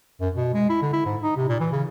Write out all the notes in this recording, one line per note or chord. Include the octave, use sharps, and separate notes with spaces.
F#2
B2
G#3
E4
D3
E4
G#2
D#4
C3
A#2
E3
C#3